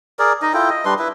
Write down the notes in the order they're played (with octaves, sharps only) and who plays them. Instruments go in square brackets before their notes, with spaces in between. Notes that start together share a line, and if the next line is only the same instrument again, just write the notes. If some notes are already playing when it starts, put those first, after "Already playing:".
[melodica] G#4 A#4 D5
D#4 D#5
E4 F4 A4 G5
D#5
G3 D4 B4 C6
E4 B4 E5